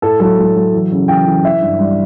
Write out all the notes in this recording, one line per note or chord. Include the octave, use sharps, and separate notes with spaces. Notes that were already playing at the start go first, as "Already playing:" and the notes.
A2 A4
F#3 A4
F#3
F#3
E3
C#3
E3 G5
E3
E3 E5
G2
G3